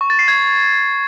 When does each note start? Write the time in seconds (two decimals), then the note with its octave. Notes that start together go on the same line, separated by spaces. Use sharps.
0.01 C#6
0.10 A6
0.19 C7
0.28 G#6